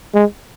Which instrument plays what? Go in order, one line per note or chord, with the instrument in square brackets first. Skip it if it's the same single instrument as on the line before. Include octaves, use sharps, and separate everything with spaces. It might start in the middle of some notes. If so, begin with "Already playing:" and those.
[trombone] G#3